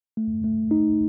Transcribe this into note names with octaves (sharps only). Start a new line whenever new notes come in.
A3
A3
D#4